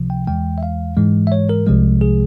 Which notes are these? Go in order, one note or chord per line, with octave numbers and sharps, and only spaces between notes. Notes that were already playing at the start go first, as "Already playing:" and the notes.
Already playing: C#2 C3 F3
G5
E2 E3 G#3 G5
E5
F5
G#2 E3 G#3
E5
C#5
A#4
C2 C3 F3 G#3
G#4